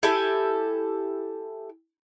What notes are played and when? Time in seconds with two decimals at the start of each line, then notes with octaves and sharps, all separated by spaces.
0.03 E4 G4 A4 G#5